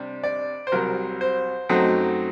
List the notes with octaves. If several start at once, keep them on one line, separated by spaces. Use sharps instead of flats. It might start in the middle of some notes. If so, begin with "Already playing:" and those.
Already playing: C3 G3 D4
D5
C5
C2 C3 F#3 A#4
C5
F#2 F#3 A3 C4 D#4